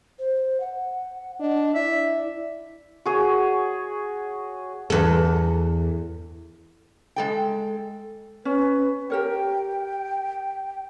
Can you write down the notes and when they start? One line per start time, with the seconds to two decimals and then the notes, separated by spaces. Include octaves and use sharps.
0.19 C5
0.60 F#5
1.40 D4 D#5
1.74 E4 D5 E5
3.06 F#4 G#4 C#5
4.90 E2 A4
7.16 G#3 A4 G5
8.45 C#4 B4
9.10 G4 A#4 C#5 G5